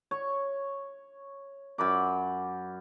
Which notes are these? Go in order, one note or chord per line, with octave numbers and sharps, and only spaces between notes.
C#5
F#2 B5 D6